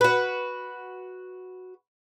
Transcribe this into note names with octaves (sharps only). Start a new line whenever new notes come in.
F#4 B4